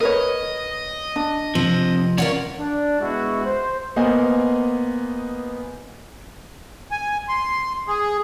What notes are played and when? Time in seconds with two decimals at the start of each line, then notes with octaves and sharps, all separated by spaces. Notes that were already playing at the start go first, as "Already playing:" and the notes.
0.01 A#4 B4 C#5 D#5
1.16 D4
1.55 C3 F3 C4
2.18 C#4 F4 A#4 C#5 D5 F#5
2.59 D4
3.01 G#3 B3 E4 F#4
3.45 C5
3.96 A#3 B3 C5 D#5 F#5 G#5
6.91 G#5
7.28 C6
7.88 G#4